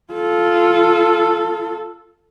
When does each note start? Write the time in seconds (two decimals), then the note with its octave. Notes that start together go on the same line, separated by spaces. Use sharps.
0.13 F4 A4